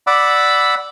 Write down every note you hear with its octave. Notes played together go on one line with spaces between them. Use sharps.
D5 F#5 B5 D6 E6